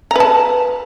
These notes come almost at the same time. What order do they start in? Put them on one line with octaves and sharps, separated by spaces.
A#5 B4 A5